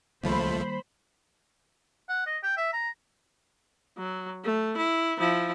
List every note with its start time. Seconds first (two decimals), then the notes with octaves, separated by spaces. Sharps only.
0.23 C#2 D#3 F3 G3 A3 A#3 C5 B5
2.09 F#5
2.27 D#5
2.43 G5
2.57 E5
2.73 A#5
3.97 F#3
4.44 A3
4.77 E4
5.18 F3 E4